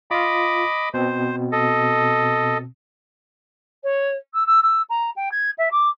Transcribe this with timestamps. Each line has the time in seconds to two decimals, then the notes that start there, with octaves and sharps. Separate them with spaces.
0.11 F4 D#5 F5 B5 D6
0.94 B2 C4 C5
1.52 A4 D#5
3.83 C#5
4.34 E6
4.46 E6
4.62 E6
4.89 A#5
5.16 G5
5.31 G#6
5.58 E5
5.71 D6